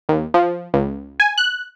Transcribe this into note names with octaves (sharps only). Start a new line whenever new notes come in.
D#2
F3
C#2
G#5
F#6